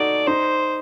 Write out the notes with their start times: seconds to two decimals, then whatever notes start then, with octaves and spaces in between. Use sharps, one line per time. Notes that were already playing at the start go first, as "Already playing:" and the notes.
Already playing: D#4 F#4 A4 D5
0.27 D#4 C5